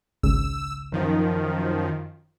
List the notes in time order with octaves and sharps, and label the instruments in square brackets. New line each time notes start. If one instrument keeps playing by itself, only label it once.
[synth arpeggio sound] G#1 C#2 C#3 [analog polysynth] E6
[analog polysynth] F#2 D#3 F3